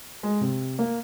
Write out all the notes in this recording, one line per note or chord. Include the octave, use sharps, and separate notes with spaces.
G#3
C3
A#3